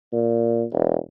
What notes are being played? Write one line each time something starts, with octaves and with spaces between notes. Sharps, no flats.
A#2
E1